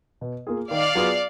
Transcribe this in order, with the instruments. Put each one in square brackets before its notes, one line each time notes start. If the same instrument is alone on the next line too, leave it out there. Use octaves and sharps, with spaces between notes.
[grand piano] B2
A#3 F4 G#4
[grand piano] D#3 [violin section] D5 F5
[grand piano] F#3 B3 F4 G#4